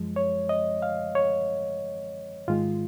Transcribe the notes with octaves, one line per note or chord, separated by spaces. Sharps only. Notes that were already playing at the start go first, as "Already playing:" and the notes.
Already playing: F#2 F3 G#3
C#5
D#5
F5
C#5
G#2 D#3 G#3 F4